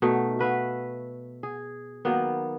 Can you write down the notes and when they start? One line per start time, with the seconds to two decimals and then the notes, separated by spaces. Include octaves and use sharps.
0.02 B2 A3 D#4
0.39 F#4 B4 E5 F5
1.43 G#4
2.05 D#3 F#3 A#3 B3